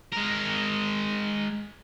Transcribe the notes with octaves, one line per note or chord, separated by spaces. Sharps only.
G#3 A#4